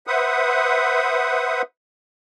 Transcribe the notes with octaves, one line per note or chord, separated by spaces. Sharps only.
B4 C5 E5 F#5 D#6